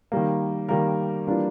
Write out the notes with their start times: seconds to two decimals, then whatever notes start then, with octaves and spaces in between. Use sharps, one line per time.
0.12 D#3 G3 A#3
0.69 D#3 G3 A#3 A#4
1.27 E3 G3 A#3 D4 F4